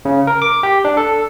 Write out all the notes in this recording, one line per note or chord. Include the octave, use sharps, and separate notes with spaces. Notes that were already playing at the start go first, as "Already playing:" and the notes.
C#3
A#4
D6
G4
D4
A4